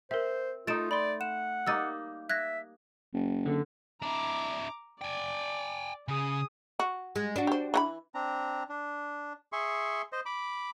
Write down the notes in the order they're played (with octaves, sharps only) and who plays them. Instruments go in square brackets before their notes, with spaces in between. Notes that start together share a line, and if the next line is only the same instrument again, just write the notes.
[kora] C4 [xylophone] A#4 E5 [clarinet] C5
[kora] A3 D#4 [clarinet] F4 [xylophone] A6 D7 E7
[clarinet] D5 [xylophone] B5 C6
[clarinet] F#5 [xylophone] E7
[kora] G3 A#3 D#4 [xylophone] E6 A6 D#7
[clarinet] E5 [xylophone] F#6 G#6 A#6
[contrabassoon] F#1
[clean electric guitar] D3
[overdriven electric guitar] D4 E4 [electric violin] A#5 D6
[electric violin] D5 [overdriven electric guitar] G5 G#5
[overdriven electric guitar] C#3 [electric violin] G#4 D#6
[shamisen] F#4
[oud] G#3
D4 F#4
[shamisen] G4 C5
E3 F#5 B5
[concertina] C4 D4 A#5
D4
G#4 E5 C6 C#6
C5 D#5
B5 D6